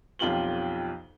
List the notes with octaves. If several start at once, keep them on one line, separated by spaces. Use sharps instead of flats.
B1 F2 F4 G4 F#7 G7